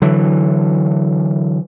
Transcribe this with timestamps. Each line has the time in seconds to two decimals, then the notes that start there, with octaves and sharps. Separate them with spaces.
0.02 D3 E3 F#3